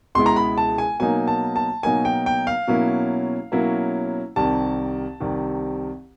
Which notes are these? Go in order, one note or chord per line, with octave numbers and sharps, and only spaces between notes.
C#2 B2 G#3 B3 E4 C6
A#5
B5
A5
G#5
B2 F#3 A#3 D#4 G#5
A5
A5
B2 F#3 A#3 D#4 G#5
G5
G5
F5
B2 F#3 A#3 C#4 E4
B2 F#3 A#3 C#4 E4
C2 C3 D#3 A5
C2 C3 D#3